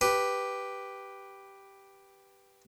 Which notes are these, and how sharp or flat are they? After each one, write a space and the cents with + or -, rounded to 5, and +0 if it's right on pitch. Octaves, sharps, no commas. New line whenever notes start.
G4 +0 B4 +0